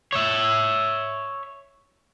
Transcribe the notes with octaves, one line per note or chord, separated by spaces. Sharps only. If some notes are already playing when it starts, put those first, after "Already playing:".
C#5 E5